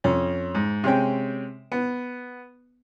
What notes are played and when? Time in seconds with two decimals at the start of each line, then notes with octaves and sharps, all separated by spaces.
0.04 F2 C#4
0.55 G#2
0.84 C3 G#3 C#4 G5
1.72 B3